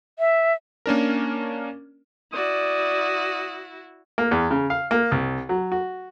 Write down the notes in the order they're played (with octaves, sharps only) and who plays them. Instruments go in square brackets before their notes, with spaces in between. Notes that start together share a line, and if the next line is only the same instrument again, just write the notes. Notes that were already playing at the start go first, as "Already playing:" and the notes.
[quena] E5
[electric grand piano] A#3 C#4 D4 A#4
[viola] E4 F#4 [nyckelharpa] D5 [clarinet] D#6
[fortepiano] A#3
E2
C#3
F5
A#3
C2
F#3
F#4